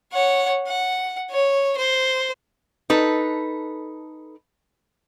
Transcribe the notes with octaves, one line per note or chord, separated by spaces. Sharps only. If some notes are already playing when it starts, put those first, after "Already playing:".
C#5 F#5
F#5
C#5
C5
D#4 A4 B4